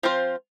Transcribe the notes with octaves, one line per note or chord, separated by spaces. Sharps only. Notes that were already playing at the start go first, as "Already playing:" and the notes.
F3 C4 F4 C5